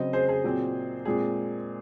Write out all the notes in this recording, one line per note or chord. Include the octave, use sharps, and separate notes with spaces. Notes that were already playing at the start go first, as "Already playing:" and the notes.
Already playing: C#3 F#3 C4 C5 D#5
G#4 C5
G#4 C5
A#2 F#3 C4
A#2 G#3 C4 G#4